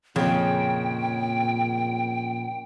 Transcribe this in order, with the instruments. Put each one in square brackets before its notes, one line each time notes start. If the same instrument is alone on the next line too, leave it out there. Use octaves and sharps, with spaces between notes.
[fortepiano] F2 [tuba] A#2 [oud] C#3 [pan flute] G5